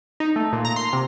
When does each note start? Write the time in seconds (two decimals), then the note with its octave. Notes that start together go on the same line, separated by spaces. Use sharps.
0.20 D#4
0.36 A3
0.53 A#2
0.65 A#5
0.76 C6
0.93 C3